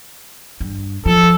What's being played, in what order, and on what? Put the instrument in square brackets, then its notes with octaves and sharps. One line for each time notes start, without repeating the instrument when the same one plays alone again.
[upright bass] G2
[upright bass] F3 [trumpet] A4